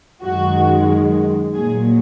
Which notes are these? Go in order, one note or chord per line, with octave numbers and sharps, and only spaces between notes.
F#2 D#3 G#3 F#4
A#2 F#3 G#4